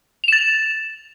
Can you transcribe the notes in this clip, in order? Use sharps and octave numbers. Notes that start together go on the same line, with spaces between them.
A6 E7 F7